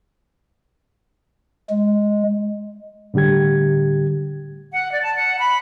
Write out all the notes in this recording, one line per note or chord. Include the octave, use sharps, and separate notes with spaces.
G#3
A2 D3 G3 G4 G#6
F#5
D5
A5
F#5
B5